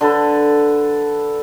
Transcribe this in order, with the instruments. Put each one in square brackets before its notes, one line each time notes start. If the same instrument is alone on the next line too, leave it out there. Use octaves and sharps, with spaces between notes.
[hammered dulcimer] D3 A4 B4